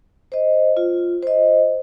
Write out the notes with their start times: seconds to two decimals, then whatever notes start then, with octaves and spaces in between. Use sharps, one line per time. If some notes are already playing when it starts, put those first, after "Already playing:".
0.32 C5 D#5
0.77 F4
1.23 C5 D#5